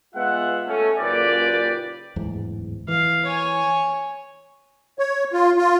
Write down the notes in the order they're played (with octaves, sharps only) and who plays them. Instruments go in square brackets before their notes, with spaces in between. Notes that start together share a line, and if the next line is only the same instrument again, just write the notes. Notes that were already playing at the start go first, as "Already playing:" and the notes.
[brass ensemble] G#3 B3 F4 E5 F#5
A3 C#4
F#1 A#2 C#3 G4 B4 D5
[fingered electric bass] D1 E2 G#2
[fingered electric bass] E3 [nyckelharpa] F5
[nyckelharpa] C#5 G#5
[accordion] C#5
F4
F4